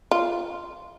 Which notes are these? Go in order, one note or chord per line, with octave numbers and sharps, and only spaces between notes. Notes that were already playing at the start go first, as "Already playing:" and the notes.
F4